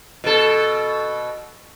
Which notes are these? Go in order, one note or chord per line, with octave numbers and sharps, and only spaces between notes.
B2 A4